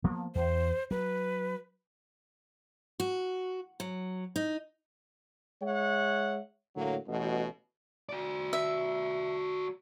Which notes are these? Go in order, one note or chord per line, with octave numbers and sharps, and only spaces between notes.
F3 A#3 B3
E2 C5
F#3 B4
F#4
F#3
D#4
G#3 C#5 E5 F#5
A2 D3 F#3 A#3
A1 B2
F#4 D5
E5